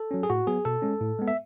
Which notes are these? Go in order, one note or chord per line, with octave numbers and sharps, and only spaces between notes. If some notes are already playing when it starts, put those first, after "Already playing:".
Already playing: A4
F#3 C#4
G#4
A2 F#4
F#3 B3 G#4
B2 A4
G#3 C#4
A2
G#3 B3
E5